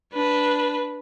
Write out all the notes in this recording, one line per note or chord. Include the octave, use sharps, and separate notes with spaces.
D4 B4